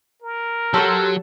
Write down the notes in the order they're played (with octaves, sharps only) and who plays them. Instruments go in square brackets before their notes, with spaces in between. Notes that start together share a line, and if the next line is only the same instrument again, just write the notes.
[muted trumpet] A#4
[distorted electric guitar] F#3 [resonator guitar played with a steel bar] G4 A4 [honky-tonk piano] A5 C6 E6